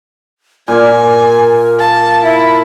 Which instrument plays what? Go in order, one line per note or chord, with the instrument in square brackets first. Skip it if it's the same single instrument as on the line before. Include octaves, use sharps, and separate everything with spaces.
[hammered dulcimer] A#2 A#3 F4 [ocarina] A#4 [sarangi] G#5
[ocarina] F5 [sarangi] A5
[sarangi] E4 [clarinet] E5 [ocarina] B5